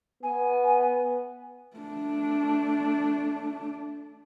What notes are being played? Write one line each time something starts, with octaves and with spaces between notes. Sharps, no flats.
B3 G#5
A3 D4